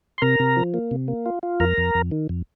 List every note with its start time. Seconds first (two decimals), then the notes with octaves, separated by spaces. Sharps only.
0.18 C6
0.22 C3 A#4 A#5
0.40 C3
0.57 F3
0.74 A#3
0.91 C3
1.08 A#3
1.26 F4
1.43 F4
1.60 F2 A#4 A#5
1.77 F2
1.95 F2
2.11 D#3
2.29 F2